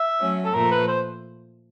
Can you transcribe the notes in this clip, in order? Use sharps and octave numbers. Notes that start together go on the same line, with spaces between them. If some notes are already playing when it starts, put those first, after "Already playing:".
Already playing: E5
F#3 A3 C#4
A4
A#2 F3 A3 A#4
B4
C5